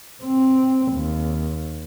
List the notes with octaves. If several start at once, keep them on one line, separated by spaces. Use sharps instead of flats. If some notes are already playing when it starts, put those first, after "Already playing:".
C4
D#2